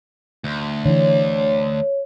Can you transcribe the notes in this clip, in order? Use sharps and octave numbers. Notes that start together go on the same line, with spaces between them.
D2
D3 E3 C#5